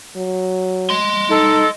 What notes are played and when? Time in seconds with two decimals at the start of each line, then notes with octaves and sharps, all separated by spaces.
0.16 F#3
0.90 D#5 C6
1.30 D#4 A4